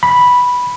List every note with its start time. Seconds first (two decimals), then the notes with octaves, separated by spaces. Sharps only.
0.03 B5